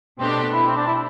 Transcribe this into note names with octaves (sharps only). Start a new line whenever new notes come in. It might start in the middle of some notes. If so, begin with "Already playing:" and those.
B2 A3 C4 D4 G4
E4
C4
D4
E4